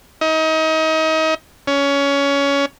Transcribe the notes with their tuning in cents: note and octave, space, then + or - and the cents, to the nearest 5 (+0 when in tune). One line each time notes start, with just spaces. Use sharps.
D#4 +30
C#4 +20